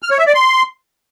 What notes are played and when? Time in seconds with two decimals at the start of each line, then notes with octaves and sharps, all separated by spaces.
0.02 F6
0.11 C#5
0.19 E5
0.27 D5
0.35 C6